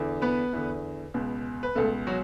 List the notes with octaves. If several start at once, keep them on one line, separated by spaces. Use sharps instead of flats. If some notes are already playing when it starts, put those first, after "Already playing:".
Already playing: E2 D3
B3 B4
E2 D3
C#2 B2
B4
C#2 B2 A3 A4
F#3 F#4